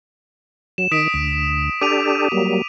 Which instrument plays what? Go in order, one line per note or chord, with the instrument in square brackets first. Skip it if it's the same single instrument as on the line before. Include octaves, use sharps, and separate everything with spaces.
[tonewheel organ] F#3 [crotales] E7
[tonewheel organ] D#3 [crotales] D#6 B6 D7
[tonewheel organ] D2
[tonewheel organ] D4 G4 A4 [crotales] D6 D#7 F7
[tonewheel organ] F#3 G3 A#3